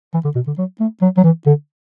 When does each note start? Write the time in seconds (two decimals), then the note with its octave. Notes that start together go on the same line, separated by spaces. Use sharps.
0.14 E3
0.25 D3
0.35 B2
0.47 D3
0.58 F#3
0.80 A3
1.02 F#3
1.17 F#3
1.24 E3
1.47 D3